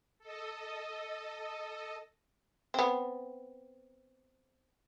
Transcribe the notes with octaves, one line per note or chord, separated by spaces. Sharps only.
A4 D#5
B3 C4